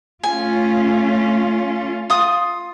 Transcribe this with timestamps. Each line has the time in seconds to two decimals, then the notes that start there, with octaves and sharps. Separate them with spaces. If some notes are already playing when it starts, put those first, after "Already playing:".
0.23 A3 C#4 F4 G#5
2.10 F4 D#6